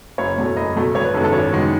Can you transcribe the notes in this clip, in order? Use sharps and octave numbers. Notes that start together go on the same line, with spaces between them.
F#1 C#5
E2 B2 A3
F#1 D#5
E2 B2 A3
G#1 C#5
B4
F#2 D#3 G#3 B3 A4
A4
G#1 C#5
F#2 D#3 G#3 B3